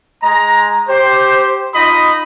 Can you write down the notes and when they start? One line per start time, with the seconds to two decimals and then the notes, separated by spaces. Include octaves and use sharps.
0.23 G#3 D#5 A#5
0.88 G4 C5
1.74 D#4 F4 D#5 B5 D#6